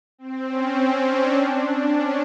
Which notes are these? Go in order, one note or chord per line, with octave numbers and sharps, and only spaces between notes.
C4
C#4
C#4
D4
D4
D4
C#4